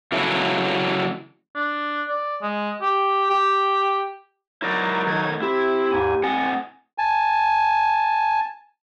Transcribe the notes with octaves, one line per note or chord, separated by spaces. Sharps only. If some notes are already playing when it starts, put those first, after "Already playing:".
C#3 E3 F#3 A3 E4 G#4
D4
D5
G#3
G4
G4
F#3 D#4 E4 A#4 D5
D#3 A3 G#6
C4 E4 G4
D#2 G#2 G#5
A2 C4 D#5 F#5 G#5
G#5 A5